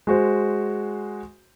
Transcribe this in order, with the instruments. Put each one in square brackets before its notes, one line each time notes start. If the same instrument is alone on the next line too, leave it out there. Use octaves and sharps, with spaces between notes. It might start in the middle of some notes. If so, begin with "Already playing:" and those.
[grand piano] G#3 F#4 C5